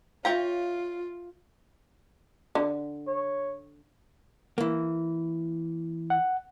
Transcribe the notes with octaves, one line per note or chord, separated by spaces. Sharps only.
F4 C#5 E5 F5 G5 A#5
D3
C#5
E3 A#3
F#5